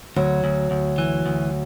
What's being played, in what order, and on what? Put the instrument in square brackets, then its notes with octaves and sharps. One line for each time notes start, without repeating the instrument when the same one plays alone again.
[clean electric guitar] D2 [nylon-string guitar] F#3
[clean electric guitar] D2
D2
E3
D2